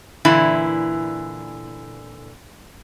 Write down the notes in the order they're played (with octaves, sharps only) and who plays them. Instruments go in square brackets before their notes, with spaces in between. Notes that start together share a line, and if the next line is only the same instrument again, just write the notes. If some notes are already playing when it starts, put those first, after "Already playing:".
[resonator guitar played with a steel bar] A#2 D3 E3 E4